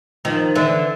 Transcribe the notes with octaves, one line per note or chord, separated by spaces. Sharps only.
D#3 F3
D3 E3